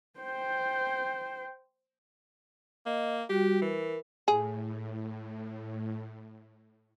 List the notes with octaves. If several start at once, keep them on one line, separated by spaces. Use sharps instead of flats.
C5 G5
A#3 D#5
G3 F#4 G4
E3 A#4
A2 G#4